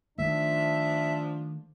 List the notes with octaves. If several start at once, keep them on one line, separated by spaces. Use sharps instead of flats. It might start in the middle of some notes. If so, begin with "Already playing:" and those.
D#3 F3 A3 D4 E5